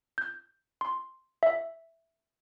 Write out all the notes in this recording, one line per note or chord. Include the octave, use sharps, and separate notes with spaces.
G6
C6
E5